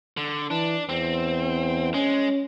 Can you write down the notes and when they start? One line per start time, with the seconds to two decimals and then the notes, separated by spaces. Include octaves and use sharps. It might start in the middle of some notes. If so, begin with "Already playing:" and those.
0.17 D3
0.51 E3 D4
0.89 E2 C4
1.94 G#3 C#4